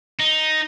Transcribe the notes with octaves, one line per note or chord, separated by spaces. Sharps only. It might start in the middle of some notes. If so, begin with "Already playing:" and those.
D#4